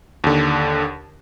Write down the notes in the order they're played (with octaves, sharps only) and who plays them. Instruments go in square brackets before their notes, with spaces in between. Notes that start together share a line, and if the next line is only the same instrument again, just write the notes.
[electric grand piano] D#2 D3